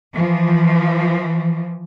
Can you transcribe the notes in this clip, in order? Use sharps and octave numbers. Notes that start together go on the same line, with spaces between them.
E3 F3